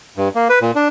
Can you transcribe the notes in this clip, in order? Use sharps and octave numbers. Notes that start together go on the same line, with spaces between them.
G2
A#3
B4
A#2
D4